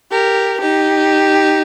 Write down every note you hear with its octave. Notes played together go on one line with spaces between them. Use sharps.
G4 A#4
D#4 G4